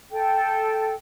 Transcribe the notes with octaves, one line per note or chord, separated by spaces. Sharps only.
A4 G5